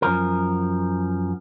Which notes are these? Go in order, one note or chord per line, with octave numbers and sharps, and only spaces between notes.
F#2 F3 A#4